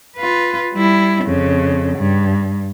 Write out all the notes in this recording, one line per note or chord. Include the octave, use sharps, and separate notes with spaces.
F4 B4
G3 E4
F2 C#3
G2